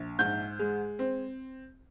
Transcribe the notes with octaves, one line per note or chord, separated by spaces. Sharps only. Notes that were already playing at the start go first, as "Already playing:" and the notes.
Already playing: A#1
G#2 G6
G#3
C4